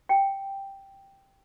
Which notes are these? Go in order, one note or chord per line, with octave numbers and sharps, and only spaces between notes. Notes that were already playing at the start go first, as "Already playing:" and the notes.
G5